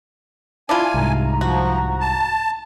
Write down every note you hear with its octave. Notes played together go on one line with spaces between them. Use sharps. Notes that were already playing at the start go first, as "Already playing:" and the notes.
D4 E4 F4 G#5
C2 G#2 A#5
F3 F#4
A5